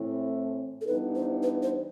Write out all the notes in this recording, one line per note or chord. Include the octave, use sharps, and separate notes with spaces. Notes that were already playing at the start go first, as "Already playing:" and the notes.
Already playing: A2 E3 A3 C4
A4
G2 E3 B3 D#4 B4
C5
B4
C5